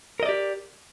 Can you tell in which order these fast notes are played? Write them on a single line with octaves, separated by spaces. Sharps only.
A#4 D#5 D5 G4